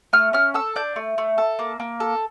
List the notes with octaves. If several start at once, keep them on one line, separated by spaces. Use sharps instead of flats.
A3 F6
C#4 F6
A4 E6
D4 G6
A3
A3
A4
A#3
A#3
A4